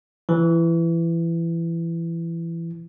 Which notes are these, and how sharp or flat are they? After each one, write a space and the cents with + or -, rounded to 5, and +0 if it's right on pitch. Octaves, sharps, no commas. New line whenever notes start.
E3 +20